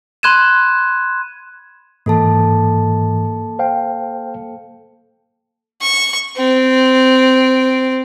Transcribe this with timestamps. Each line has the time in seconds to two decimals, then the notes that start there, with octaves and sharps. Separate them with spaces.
0.23 B5 C6 F#6 G#6 D#7 E7
2.06 G#2 E3 A#3 A4 A5
3.59 C5 F5 G5
5.81 C#6
6.37 C4